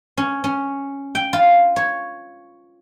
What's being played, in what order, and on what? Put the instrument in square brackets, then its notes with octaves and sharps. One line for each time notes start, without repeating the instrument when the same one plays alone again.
[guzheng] C#4
C#4
G5
F4
C#5